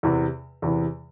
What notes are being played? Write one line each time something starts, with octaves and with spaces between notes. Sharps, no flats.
E2 C3 E3
E2 C3 E3